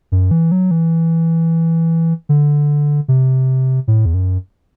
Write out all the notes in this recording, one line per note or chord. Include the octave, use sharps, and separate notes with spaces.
F#2
E3
F#3
E3
D3
C3
A2
E2
F#2